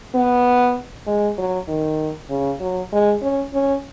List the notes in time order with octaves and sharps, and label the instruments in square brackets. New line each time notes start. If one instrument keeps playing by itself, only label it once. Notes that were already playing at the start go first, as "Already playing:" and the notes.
[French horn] B3
G#3
F#3
D#3
C#3
F#3
G#3
C#4
C#4